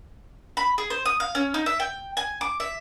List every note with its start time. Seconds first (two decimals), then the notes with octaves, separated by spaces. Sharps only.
0.57 B5
0.78 G#4
0.90 C5
1.06 D#6
1.20 F5
1.35 C#4
1.54 D#4
1.66 E5
1.80 G5
2.17 G#5
2.41 D6
2.60 E5